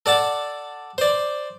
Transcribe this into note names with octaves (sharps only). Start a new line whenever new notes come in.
A4 D5 F#5 A5
C5 D5